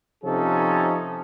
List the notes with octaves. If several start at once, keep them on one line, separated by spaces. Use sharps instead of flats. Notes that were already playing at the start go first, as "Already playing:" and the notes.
C3 F3 C#4 D#4 A4